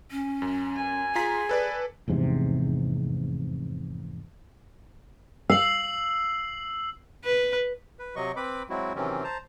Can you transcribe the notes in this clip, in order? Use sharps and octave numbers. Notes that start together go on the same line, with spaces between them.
C#4
F#2
G#5
F4 G#4 A#5 B6
A4 B4 D5
F1 E2 G#2 C3
F5 E6 C7 F#7
B4
B4
C3 F#3 D#5 C#6
C4 B4 B5 D6
F#3 G#3 C4 E4 F#4
C3 D#3 E3 F#3 C4 C#4
C5 A5 A#5